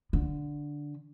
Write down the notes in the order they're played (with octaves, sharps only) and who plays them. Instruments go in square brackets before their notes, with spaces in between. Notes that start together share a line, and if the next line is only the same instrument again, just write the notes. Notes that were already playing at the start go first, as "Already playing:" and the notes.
[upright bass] D3